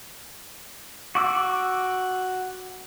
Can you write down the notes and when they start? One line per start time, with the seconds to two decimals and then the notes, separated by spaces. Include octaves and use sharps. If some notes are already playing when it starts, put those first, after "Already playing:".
1.15 F#4 D6 E6